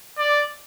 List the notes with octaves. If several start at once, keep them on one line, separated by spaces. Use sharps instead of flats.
D5